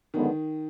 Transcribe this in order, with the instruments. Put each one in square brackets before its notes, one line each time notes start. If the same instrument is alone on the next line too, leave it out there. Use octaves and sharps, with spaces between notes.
[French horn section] F#2 D3 G#3 B3 [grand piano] D#3